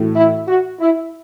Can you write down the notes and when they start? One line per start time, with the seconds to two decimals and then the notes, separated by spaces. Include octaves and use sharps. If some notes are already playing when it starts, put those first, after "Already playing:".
Already playing: A2 E3 A3 F#4
0.15 E4
0.48 F#4
0.80 E4